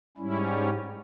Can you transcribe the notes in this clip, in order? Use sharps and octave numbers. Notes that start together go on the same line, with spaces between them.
G#2 G3 C#4 E4